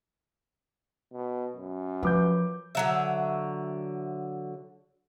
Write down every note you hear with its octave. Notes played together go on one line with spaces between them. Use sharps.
B2
F#2
F3 B4 D6 G6
D3 F#3 E5